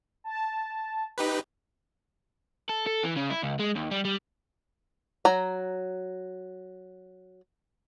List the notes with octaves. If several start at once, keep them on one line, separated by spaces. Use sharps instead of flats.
A5
D#4 G4 B4
A4
A4
E3
C#3
E4
C#2
G#3
D#2
G3
G3
F#3 A#5